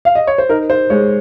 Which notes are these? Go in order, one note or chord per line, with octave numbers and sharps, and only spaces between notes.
F5
D#5
C#5
C5
D#4 A#4
C5
G#3 C#5